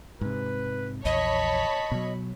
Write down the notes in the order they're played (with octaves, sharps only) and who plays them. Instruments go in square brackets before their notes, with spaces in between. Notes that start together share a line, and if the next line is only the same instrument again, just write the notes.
[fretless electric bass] G#2 C3 [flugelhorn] B4
[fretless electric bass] A#1 E2 [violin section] C#5 B5 C#6 [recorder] D#5 [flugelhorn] A5
[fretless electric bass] B2 F#3